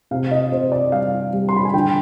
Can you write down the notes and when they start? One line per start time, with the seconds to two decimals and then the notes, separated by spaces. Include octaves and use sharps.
0.11 C3 F5
0.31 D#5
0.52 C3 C5
0.72 D5
0.92 G3 F5
1.33 G3
1.49 C6
1.56 B5
1.65 G#5
1.74 D3 G5